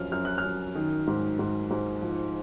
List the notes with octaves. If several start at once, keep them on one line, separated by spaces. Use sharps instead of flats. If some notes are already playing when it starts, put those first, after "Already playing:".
Already playing: F#2 F3 F6
F#2 F6
F#6
F6
F#2
D#3
G#2
G#2
G#2
F3